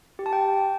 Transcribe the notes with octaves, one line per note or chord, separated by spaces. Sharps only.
G4
A5
G5